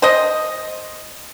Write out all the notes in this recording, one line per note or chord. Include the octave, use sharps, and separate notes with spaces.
C5 D#5